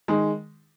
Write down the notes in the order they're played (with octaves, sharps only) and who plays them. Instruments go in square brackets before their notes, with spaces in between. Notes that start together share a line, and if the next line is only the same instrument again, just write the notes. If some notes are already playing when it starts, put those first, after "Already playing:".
[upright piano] D#3 G#3